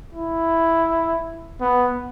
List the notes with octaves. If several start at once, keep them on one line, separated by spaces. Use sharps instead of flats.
E4
B3